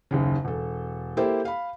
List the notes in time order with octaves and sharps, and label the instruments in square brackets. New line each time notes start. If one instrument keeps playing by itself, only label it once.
[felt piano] F#1 D#2 C#3
E1 A4
A#3 E4 G4 A4 C5
F5 B5